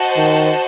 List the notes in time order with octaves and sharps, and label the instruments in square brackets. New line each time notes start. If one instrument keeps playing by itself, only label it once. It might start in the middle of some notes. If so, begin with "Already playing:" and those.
Already playing: [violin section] F#4 C5 D#5 A5
[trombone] D#3